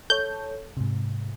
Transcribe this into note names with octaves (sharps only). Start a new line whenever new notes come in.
A4 C#5 G6
G#2 C3